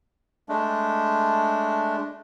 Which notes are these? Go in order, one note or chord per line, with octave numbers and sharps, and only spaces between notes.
G#3 A3 D4